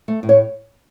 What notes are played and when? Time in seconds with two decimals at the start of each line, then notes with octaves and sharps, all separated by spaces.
0.08 A3
0.23 A2
0.29 C#5